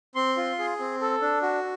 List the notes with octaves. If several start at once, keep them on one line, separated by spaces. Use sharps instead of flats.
C4 C6
F4
G#4
C4
A4
D4
F#4